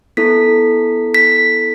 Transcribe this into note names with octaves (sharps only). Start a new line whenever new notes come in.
B3 E4 A4 B6
B6